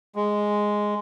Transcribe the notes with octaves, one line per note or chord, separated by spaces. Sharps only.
G#3